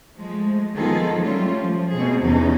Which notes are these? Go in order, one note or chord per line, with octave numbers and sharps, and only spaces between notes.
F3 G#3 A3
D#3 F3 B3 F4 G#4 A4
F#3 G3 A3 C#4 F4
F3
B2 A3 C4 G#4
E2 C3 E3 C#4 D#4